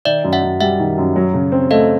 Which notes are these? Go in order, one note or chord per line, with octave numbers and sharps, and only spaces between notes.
D#3 D5 E5
F#2
E5 F#5
F#2
G3 E5 F#5
D#3
F#2
F#3
C#3
C4
A3 D#5 F5